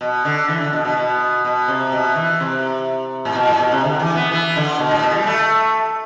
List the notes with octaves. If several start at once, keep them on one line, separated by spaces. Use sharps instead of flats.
B2
D3
E3
D3
B2
B2
B2
B2
C3
B2
E3
C3
A2
B2
A2
B2
C3
D3
E3
B3
E3
D3
B2
A2
B2
G3
A3